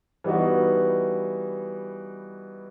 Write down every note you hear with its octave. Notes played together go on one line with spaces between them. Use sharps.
E3 G3 B3 D#4 F#4